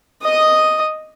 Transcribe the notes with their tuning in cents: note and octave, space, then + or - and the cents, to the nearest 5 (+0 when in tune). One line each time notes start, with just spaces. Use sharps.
D#5 +0 D#6 +0